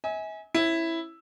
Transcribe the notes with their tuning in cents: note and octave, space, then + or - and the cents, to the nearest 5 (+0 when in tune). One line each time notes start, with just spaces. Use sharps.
E5 -45 G#5 +0
C#4 -35 E4 +0